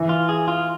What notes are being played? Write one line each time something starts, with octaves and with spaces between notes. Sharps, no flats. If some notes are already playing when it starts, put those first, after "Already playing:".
Already playing: E3
F4
G#4
F4